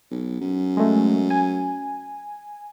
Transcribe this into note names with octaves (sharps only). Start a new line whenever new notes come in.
B1
F#2
G#3 A3
G#5